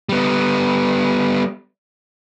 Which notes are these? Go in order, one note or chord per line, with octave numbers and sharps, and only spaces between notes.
G3 B3